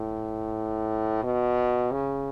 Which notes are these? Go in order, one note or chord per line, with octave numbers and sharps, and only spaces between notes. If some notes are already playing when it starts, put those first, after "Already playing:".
Already playing: A2
B2
C#3